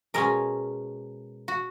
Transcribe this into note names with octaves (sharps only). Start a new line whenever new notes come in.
B2 G#3 C#4 A#4
F#4